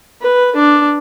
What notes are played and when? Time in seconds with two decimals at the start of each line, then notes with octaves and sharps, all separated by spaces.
0.22 B4
0.56 D4